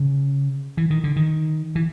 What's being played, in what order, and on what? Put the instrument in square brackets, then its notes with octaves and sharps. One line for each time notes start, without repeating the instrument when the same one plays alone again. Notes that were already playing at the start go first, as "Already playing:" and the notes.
Already playing: [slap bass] C#3
E3
D#3
D3
D#3
E3